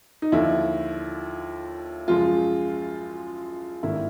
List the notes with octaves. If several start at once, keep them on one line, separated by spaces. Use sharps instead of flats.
D#4
D#2 D3 F3 E4
F#2 C#3 F3 G#3 F4
G#1 G2 D#3 G3 A#3 E4